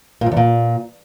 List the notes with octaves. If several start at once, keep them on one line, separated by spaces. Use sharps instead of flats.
A#2
G#2
E2
A#2